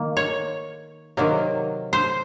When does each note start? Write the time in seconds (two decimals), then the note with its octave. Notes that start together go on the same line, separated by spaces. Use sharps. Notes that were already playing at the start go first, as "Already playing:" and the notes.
Already playing: D#3 A#3
0.17 C#5
1.17 C3 D#3 F#3 A#3
1.93 C5